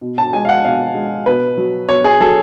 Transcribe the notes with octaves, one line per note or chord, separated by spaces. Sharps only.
B2
A5
G#3 G#5
F5
F#5
B2 F5
G#3
B2 B4
F#3
B2 C#5
G#4
F#3 A4